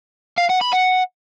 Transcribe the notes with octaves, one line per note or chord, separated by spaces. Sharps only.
F5
F#5
B5
F#5